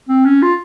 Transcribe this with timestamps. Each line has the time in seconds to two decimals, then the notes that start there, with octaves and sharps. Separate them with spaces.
0.09 C4
0.25 C#4
0.42 F4